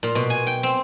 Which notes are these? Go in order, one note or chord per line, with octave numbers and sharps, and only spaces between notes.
A#2
B2
G#5
G5
C4